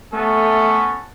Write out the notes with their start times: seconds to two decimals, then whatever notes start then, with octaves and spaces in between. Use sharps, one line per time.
0.13 A3 B3 C#4 A4